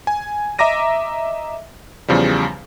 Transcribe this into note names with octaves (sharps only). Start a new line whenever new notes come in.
G#5
D#5 E5 A#5 D6 A#6 D#7
E2 C#3 F3 G3